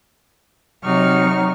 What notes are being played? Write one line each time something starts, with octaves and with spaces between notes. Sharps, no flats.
C3 F#3 D#4 C#6 F6